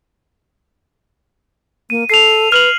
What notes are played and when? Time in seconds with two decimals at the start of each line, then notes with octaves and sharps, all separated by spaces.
1.90 A#3 D#7
2.10 A4 C7 F7
2.52 B4 F6 F7 F#7